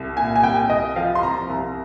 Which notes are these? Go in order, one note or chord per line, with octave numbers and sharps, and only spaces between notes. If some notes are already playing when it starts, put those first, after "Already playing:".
Already playing: C2
A#2 G#5
G#5
C2 G5
C2 D#5
F3 F5
C6
C2 A#5
C2